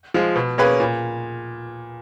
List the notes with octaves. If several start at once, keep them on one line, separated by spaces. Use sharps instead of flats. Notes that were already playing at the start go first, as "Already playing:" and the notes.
F3 G#3
B2
A#3 C#4 G#4 B4
A#2